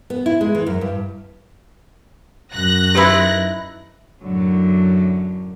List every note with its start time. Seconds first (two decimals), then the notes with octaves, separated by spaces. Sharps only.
0.10 B3
0.26 E4
0.41 G#3
0.55 E3
0.66 F#2
0.81 G2
2.53 F#2 F#6 A#6
2.95 D#4 E4 G4 B4 C6
4.21 F#2 A2 D3 F#3